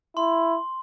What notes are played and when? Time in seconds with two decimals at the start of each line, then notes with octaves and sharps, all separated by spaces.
0.17 E4 C6